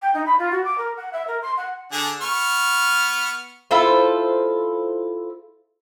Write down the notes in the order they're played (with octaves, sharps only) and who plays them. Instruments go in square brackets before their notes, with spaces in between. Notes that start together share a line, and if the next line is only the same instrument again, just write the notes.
[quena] G5
D#4
B5
F4
F#4
D6
A#4
F#5
E5
A#4
C6
F#5
[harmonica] D3 D4 G#4
B3 C#6 F6
[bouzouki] E4 F4 A4 C5